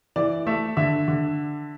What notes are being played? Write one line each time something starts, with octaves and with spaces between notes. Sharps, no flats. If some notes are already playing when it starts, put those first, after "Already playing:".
E3 D5
A3 E5
D3 E5
D3